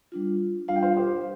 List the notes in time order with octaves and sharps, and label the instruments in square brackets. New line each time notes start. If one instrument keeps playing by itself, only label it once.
[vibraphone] G3 D4 F4
[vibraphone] G3 D4 F4 [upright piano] F5
[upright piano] G5
C5 F5
G4 C5